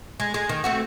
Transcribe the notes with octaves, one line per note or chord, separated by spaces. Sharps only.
G#3
G#3
D#3
A3 C4 F#4